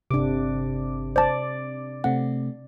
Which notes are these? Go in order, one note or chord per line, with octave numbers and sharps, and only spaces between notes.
G1 C3 D4 D6
C5 D5 A5
C3 A3 C4 F#5